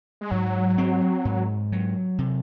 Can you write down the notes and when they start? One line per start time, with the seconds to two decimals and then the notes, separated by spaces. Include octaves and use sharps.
0.21 G#3
0.31 G#2 F#3
0.78 C4
1.25 G#2
1.72 F#3
2.18 C3